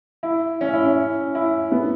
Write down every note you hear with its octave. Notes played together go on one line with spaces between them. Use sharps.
E4
C#4
E4
C#4
E4
B3